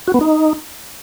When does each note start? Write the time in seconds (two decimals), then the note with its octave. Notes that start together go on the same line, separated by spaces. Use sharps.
0.07 F#4
0.14 B3
0.21 D#4